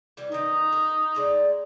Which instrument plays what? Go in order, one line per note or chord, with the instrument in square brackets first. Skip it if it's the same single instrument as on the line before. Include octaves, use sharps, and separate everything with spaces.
[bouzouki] E3 F#3 G3
[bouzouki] D#3 B3 [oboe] D#4
[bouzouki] A#4
A2 G#3 D5